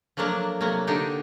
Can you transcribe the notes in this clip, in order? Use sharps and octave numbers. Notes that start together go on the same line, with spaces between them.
F3 F#3 A3 A#3 D4
C3 F#3 A3 A#3
D3 D4 D#4 G4